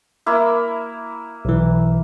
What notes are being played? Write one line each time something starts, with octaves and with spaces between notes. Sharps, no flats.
A#3 E4
B1 E3